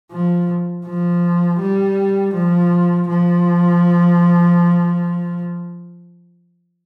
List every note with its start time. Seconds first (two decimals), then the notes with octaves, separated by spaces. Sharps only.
0.12 F3
0.86 F3
1.60 G3
2.34 F3
3.09 F3